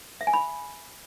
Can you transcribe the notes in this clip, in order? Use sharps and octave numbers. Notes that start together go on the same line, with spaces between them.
E5
G#5
B5